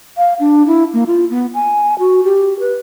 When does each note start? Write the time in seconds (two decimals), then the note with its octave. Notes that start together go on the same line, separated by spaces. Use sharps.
0.17 F5
0.40 D4
0.67 E4
0.94 A#3
1.07 F4
1.30 B3
1.54 G#5
1.99 F#4
2.24 G4
2.59 B4